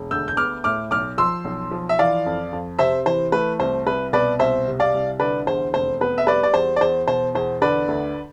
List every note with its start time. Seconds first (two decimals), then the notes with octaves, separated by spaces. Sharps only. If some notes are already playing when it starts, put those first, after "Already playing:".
Already playing: E1
0.11 D2 E6 G6
0.28 G6
0.37 B3 D6 F6
0.64 A2 D6 F6
0.91 B1 D6 F6
1.18 F3 C6 E6
1.45 B1
1.71 F3
1.89 E5
1.99 E3 D5 F5
2.26 F2
2.52 F2
2.79 C3 C5 E5
3.06 E3 C5
3.32 A3 B4
3.60 C2 C5
3.86 C2 B4
4.13 B2 B4 D5
4.39 C2 C5 E5
4.67 C3
4.80 D5 F5
4.94 C2
5.20 D3 B4 D5
5.47 E2 C5
5.73 F1 C5
6.01 B3 B4
6.18 E5
6.27 G3 B4 D5
6.43 D5
6.54 E2 C5
6.76 D5
6.81 E2 C5
7.08 B2 C5
7.34 E2 C5
7.61 D3 B4 D5
7.88 D2